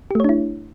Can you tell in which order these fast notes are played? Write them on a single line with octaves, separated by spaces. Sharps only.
G4 A3 C#5 D4 E4